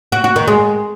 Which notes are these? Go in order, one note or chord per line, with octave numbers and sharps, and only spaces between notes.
F#4
F#4
D#3
G#3